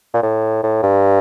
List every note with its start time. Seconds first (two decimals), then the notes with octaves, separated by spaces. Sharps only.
0.14 A#2
0.23 A2
0.63 A2
0.83 G2